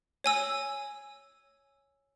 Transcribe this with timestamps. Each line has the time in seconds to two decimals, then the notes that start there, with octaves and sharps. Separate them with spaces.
0.24 C#5 G#5 E6